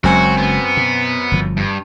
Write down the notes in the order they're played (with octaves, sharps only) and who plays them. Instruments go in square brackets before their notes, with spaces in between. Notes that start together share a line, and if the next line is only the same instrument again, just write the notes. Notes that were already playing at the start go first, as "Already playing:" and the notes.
[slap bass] F#1 F#3 G#3 [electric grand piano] F#2 C4 G#5 [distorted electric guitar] F#4
[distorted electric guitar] B3
[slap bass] B2
G1 F3
[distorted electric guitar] G2